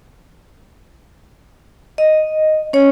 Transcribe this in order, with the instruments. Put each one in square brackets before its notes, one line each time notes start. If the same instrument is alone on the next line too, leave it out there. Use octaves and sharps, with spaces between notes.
[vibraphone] D#5
C#4 C#5